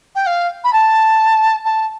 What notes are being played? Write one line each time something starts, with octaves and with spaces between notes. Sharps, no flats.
G5
F5
B5
A5
A5